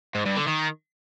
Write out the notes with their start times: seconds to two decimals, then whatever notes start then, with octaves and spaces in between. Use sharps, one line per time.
0.15 G#2
0.26 G2
0.37 D3
0.48 D#3